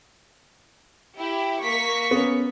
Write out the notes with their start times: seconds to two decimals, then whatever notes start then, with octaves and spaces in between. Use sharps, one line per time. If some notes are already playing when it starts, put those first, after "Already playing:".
1.18 E4 G4
1.63 A#3 C#6 B6
2.11 B3 C#4